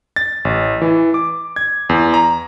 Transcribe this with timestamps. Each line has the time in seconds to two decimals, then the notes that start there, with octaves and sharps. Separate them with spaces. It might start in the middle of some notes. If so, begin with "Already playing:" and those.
0.16 A6
0.45 A1
0.82 E3
1.14 D6
1.56 G#6
1.89 E2
2.14 A#5